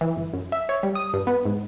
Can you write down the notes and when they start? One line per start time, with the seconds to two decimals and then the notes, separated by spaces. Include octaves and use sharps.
0.01 E3
0.16 G1
0.33 F#2
0.52 E5
0.69 C#5
0.83 G3
0.95 D#6
1.14 G2
1.27 B3
1.45 G#2